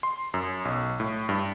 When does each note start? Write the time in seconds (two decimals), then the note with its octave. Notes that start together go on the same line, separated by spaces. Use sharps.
0.03 C6
0.34 F#2
0.65 B1
1.00 A2
1.29 G2